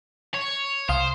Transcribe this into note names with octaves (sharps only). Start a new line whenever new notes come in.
C#5
C2 C5 F5 D#6